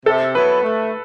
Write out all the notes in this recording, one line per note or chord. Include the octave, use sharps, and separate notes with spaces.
C3 A4
F#3 B3 E4 B4
A3